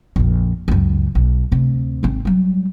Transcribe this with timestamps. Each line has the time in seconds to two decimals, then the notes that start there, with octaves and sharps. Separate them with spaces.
0.16 A#1 F2
0.68 C#2 F#2
1.15 B1
1.52 D2 C3
2.03 G#1 C4
2.25 F#3 G3